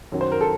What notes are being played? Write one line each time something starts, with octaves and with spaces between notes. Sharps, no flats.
F#2 D#3 F#3
C5
A#4
A4